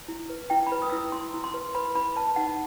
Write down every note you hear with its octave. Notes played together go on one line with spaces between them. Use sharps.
E4
B4
E4 G5
B5
B4
D#6
E6
E4 D#6
E4 C6
E4
C6
B4
B4 B5
E4 B5
B4 A5
D#4 F#5